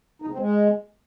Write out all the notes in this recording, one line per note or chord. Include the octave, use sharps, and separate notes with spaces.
D#4
C#3
C4
G#3